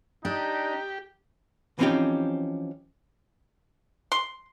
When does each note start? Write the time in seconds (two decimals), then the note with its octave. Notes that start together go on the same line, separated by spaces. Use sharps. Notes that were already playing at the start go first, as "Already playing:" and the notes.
0.25 D4 D#4 G4
1.79 E3 F3 C4 C#4 D#4 G4
4.12 C6